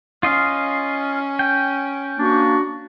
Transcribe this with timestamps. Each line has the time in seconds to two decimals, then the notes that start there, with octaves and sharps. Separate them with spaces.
0.23 C#4 F4 D#5 F5
1.39 G5
2.18 A#3 D4 F#4